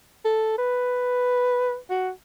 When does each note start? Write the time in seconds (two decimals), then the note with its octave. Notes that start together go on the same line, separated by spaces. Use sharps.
0.25 A4
0.58 B4
1.90 F#4